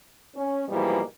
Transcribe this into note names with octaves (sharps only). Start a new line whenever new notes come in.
C#4
G#2 B2 E3 F3 G3 A#3